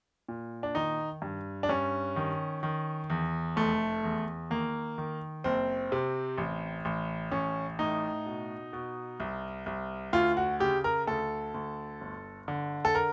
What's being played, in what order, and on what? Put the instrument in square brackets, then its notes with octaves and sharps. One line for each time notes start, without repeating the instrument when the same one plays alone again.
[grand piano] A#2
D4
D#3 D#4
G2
D4
G2 C#4
D#3
D#3
E2
F1 A3
E2
D#3 A#3
D#3
F#1 C4
C3
A1
A1
A1 C#4
A2 D#4
B2
B2
C2
C2
D2 F4
F#4
C#3 G4
A#4
D2 A4
D2
G1
D3
A4
A#4